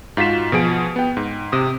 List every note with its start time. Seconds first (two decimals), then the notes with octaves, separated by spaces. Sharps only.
0.17 G#2 F4 F#4 B6 E7
0.52 B2 F3 G#4 D7
0.96 B3 G5
1.17 G#2
1.52 C3 D#6